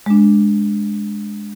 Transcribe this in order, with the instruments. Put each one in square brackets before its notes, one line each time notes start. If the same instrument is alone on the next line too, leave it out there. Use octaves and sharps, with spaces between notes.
[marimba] G#3 D4